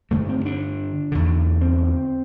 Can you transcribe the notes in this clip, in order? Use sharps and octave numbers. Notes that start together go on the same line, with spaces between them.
G2 D3 A3
C4
D4
E2 D3
C4